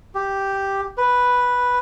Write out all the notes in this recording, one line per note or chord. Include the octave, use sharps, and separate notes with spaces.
G4
B4